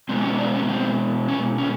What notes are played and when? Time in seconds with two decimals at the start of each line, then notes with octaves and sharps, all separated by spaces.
0.09 B2 G#3 B3 C4
0.24 C#4
0.39 D4
0.55 C#4
0.69 C4
1.28 C#4
1.58 C#4